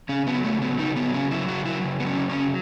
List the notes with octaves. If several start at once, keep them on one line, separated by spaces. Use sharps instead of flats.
C#3 C#4
F#3 B3
C#3 A3
F#3 B3
C#3 D#4
F#3 B3
C#3 C#4
F#3 E4
C#3 F#4
F#3 E4
C#3
F#3 B3
C#4
C#3
C#4
F#3